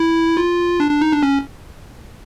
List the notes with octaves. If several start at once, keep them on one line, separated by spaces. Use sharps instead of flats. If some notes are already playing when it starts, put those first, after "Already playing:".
Already playing: E4
F4
D4
D4
D#4
D4
C#4